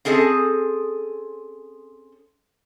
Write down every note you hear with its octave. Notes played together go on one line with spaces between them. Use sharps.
C4 C#4 G#4 A4 D#5